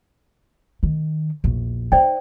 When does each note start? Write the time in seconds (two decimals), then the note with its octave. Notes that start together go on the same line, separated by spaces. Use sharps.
0.83 D#3
1.44 A#1 E2
1.92 D#4 C5 D5 G5